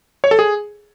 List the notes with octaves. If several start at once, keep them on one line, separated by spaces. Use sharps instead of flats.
C#5
A4
G#4